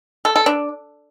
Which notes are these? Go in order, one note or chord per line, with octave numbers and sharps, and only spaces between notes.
A4
A4
D4